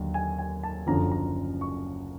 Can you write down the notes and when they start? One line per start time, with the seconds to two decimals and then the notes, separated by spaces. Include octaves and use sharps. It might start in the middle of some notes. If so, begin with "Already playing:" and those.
Already playing: D#2 D3 F#3
0.14 G#5
0.38 G#5
0.63 A5
0.87 F#1 F#2 D3 F3 A#5
1.11 A#5
1.61 C#6